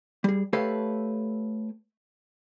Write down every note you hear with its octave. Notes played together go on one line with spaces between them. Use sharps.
G3 G#4
A3 G4 A4 B4 C#5 F5